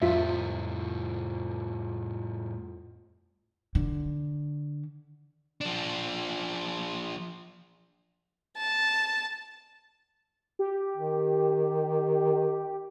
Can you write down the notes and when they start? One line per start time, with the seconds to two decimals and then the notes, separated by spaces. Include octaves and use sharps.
0.02 F2 A2 G3 F4 E5 B6
3.75 D3
5.61 F3 D4
8.57 A5
10.59 G4
10.97 D#3